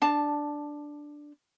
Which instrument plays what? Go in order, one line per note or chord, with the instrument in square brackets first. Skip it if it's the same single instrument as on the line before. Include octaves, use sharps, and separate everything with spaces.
[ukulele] D4 A5